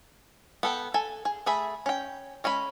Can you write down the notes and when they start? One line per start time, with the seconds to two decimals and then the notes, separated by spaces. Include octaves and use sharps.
0.63 B3 A4 G5
0.94 A4 G#5
1.25 G#4
1.46 A3 G#4 E5 B5
1.86 C#4 G5
2.44 G#3 C#4 G#5 B5